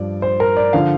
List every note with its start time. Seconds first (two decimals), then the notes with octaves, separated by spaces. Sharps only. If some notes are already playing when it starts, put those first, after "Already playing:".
Already playing: G2 F3 D5
0.22 C5
0.40 A#4
0.57 D5
0.73 D3 F3 F5